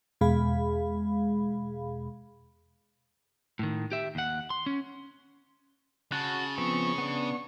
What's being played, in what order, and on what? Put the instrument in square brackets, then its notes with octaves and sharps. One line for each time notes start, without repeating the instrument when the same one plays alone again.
[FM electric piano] E2 B2 G#3 G#4 F5 B5
[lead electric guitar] A2 D#3
G4 E5
D#2 F#5
C6
C#4
[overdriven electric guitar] C#3 [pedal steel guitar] F#4 F#6 [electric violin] A5
[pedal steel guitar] F3 B3 C4 [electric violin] C#6
[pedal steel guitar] B3 D4